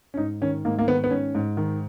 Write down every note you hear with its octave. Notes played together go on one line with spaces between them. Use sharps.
C#4
G#2 D#4
D#3 C#4
G#2 A#3
A#3
D#3 B3
B3
G#2 C#4
G#2
D#3